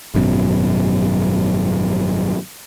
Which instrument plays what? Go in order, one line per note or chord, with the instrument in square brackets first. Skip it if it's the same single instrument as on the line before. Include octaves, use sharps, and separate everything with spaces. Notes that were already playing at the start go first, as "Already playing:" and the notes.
[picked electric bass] G#1 F#2 B2